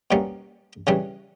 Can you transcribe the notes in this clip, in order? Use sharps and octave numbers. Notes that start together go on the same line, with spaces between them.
B2 G3 A#3 C#4
C#3 E3 G3 C#4